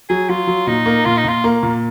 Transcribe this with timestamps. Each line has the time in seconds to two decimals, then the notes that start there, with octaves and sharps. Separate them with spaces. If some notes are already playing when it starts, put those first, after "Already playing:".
0.09 F#3 G#4
0.29 F#3 F4
0.47 F#3
0.67 A#2 D#4
0.86 A#3
1.05 A#2 F4
1.17 D#4
1.24 A#2 F4
1.44 A#3
1.63 A#2